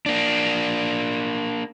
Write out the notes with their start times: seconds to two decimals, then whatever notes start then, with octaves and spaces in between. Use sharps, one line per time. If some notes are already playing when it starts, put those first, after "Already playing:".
0.06 A#3 D4